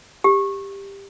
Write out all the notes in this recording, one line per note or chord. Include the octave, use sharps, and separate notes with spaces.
G4